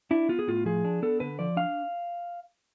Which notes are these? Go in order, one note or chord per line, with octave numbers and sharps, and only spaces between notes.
D4 E4
B3 F4
G#4
A2 F4
F3 G#4
D4
B3 A4
D3 B4
F3 D5
D4 F5